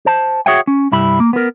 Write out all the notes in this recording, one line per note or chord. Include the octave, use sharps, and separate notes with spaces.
C5 A5
F#4 G#4 C#5 E5 F#5 G5
C#4
C2 G2 E4 G4 B5
A#3
B3 A#4